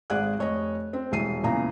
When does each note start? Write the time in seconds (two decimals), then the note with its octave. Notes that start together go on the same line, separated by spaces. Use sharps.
0.10 G#1 G#4 D5 F#5 F#6
0.38 F1 C#5 D#5
0.93 C4
1.12 E1 C2 C7 D#7
1.44 E2 A#2 C#3 A#5